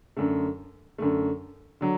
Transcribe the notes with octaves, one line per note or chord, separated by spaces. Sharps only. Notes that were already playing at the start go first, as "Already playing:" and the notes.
F#2 D3 A3
F#2 D3 A3
D3 F#3